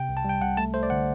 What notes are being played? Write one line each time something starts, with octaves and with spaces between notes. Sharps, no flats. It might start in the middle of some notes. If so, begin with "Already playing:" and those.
Already playing: C3 G5
C2
A5
G3 G5
C2 F#5
A3 A5
A3 C5
D5
D3 F#5